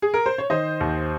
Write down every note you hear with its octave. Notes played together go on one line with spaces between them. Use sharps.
G#4
A#4
C5
C#5
D#3 C5 D#5
D#2